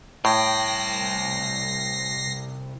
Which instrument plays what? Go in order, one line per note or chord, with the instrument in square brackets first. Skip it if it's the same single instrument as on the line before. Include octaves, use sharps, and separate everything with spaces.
[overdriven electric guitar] C2 G5 [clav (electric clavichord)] A2 [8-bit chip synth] A#6 C7